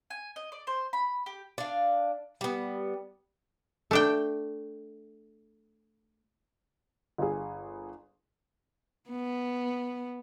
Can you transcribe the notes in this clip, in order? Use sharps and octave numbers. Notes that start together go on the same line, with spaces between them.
G#5
D#5
D5
C5
B5
G4
D4 F5
G3 B3
A3 D4 G5
G1 G#4
B3